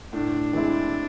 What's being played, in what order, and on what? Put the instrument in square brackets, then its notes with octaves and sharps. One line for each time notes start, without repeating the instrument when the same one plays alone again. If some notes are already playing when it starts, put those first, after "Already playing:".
[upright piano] A2 [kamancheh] D4
[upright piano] E3 G#3 C4 E4